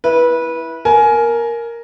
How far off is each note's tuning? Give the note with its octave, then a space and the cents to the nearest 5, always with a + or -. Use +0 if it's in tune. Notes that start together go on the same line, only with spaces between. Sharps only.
E4 +0 B4 -20
A#4 +0 G#5 +20